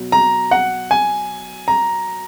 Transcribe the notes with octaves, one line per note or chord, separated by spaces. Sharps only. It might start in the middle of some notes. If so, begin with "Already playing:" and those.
Already playing: B2 F#3
A#5
F#5
G#5
A#5